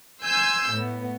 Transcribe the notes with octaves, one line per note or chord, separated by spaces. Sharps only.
G#5 C6 E6 G6
A2 B3